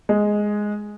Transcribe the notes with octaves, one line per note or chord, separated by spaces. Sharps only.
G#3